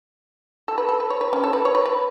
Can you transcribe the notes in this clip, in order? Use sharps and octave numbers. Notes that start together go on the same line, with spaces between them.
A4
B4
A4
B4
C#5
B4
C#4
A4
B4
C#5
B4
B4